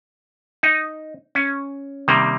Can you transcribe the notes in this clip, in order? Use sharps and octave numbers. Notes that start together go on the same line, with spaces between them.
D#4
C#4
C3 D#3 G3 A#3